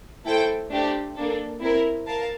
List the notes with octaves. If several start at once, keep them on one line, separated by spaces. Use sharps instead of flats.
A3 E4 A4 C5 G5
A3 D4 G4 C5
A#3 D4 A4
C4 E4 A#4
A#4 F5 A5